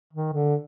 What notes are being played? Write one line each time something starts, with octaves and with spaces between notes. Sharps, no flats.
D#3
D3